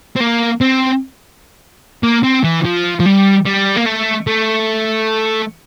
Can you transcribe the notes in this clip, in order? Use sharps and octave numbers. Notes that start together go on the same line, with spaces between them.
C4
A#3
C4
A#3
C4
E3
F3
F3
G3
G3
A#3
A3
A3